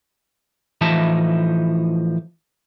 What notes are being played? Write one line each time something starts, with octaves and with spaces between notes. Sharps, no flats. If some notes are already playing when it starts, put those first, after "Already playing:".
A2 E3 F3 D#4 E5 A5